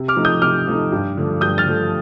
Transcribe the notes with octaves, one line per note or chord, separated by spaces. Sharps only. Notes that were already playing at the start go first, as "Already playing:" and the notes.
Already playing: C3
D6 F6
F3 A3 D#4
D#6 G6
C3 D6 F6
F3 A3 D#4
G2
D3 F3 A3
G2 D#6 G6
F6 A6
D3 F3 A3